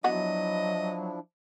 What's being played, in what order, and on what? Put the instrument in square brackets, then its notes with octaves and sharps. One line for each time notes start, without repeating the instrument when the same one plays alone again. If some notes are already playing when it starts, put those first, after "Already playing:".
[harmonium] F3 D4 E4 [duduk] F#3 [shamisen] B3 F#4 [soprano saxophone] D#5